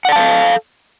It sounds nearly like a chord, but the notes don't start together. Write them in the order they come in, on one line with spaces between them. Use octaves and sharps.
F#5 D5 A5 F5 A4